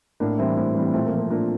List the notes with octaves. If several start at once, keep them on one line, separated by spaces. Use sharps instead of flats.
A2 A#3 D4
E3 G3 C4 E4
A2 C4 E4
E3 G3
A#2 A3 C4
A#3
F3
A#3
A#2 A#3 D4